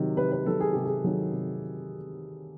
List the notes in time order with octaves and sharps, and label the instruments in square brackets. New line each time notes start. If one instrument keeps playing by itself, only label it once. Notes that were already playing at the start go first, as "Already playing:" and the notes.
Already playing: [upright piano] C3 D#3 F#3
C3 B4
B4
D#3 F#3 A4
G#4
C3 G4
G#4
D#3 F#3
C3